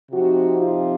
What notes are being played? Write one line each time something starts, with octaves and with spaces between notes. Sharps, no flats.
C3 F3 C4 D#4 F#4
F4